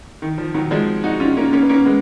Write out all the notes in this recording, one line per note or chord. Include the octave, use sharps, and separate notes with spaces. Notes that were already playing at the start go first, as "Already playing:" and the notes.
D#3
F3
D#3 F#3
F3 G#3
D#4 F#4
C#4 F4
A#3 C#4
A#3 C#4
B3
A#3 C#4
G#3 B3